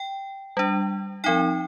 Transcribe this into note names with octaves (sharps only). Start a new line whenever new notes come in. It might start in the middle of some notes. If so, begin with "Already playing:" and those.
Already playing: G5
G3 D4
F3 C4 D#4 G5